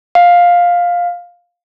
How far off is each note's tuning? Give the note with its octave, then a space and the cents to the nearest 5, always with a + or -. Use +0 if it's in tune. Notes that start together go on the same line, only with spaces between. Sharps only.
F5 +10